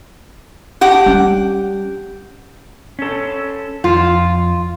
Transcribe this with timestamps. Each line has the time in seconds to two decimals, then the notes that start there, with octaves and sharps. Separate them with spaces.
0.81 G4 F#5
1.06 G3 C#4
2.99 C#4 A4
3.84 F2 F3 F4